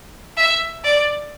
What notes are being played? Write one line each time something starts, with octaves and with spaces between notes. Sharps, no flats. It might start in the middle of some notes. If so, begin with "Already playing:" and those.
E5
D5